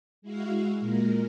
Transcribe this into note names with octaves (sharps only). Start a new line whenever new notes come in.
G#3 E4 F#4 F5
A#2 G#3 A#4